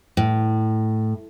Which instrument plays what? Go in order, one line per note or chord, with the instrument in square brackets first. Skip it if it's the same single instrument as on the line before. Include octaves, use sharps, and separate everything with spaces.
[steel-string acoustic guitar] A2